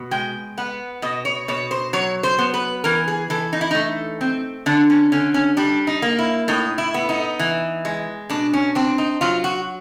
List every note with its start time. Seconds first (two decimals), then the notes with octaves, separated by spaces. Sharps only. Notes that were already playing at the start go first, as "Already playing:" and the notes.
Already playing: B2
0.11 G#3 G5
0.58 B3 F#5
1.02 B2 D#5
1.25 C#5
1.48 B2 C#5
1.71 C5
1.93 F#3 C#5
2.23 C5
2.38 B3
2.54 B4
2.84 E3 A#4
3.08 G#4
3.30 E3 A4
3.53 D#4
3.61 E4
3.71 A3 D#4
4.21 C4
4.66 D3 D4
4.90 C#4
5.12 D3 C#4
5.34 C#4
5.57 G3 D4
5.87 D#4
6.02 A#3
6.19 E4
6.48 A2 D#4
6.78 E4
6.94 B3
7.09 D#4
7.39 E3
7.85 G#3
8.30 B2 D4
8.53 C#4
8.75 C4 D4
8.98 D#4
9.21 F#3 F4
9.44 F#4